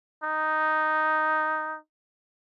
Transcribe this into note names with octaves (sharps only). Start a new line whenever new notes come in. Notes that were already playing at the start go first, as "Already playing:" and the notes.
D#4